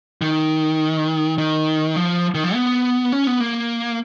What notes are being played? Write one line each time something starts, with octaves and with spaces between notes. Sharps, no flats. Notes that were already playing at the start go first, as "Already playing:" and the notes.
D#3
D#3
F3
D#3
F3
B3
C#4
B3
A#3